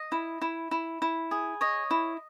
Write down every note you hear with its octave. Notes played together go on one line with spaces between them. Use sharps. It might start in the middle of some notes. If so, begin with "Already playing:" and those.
Already playing: D#5
E4
E4
E4
E4
G#4
C#5 D#5
E4